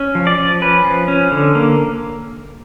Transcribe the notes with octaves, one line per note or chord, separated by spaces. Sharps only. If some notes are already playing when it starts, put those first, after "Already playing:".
Already playing: C#4
F3
D5
F3
C#4 B4
F3
C#4
D3
A#3